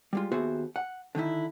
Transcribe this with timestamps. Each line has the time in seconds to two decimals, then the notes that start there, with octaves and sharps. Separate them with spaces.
0.13 G3 G#3 F4
0.32 D#2 B3 F#4 G#4 C5 E5
0.76 F#5
1.15 D3 D#3 D#4 E4